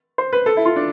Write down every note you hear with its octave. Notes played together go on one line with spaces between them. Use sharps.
C5
B4
A4
E4
F4
D4